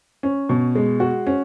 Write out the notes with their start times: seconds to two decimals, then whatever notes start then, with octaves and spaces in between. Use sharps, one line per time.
0.23 C#4
0.49 B2
0.75 G#3
1.00 F#4
1.27 C#4